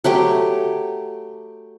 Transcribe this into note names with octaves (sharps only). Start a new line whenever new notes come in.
F#3 A3 G4 G5